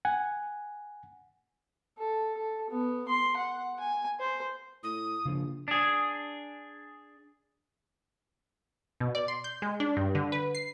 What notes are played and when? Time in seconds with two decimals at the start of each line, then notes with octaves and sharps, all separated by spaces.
0.05 F#5 G#5
1.98 A4
2.37 A4
2.70 B3
3.08 C6
3.37 F#5
3.80 G#5
4.19 C5
4.83 A2 D#6
5.25 A#1 C#3 F3
5.68 D4 G#4
9.00 B2
9.15 D5
9.28 C6
9.44 G6
9.62 G#3
9.80 D4
9.97 G2
10.15 D3
10.32 B4
10.55 C7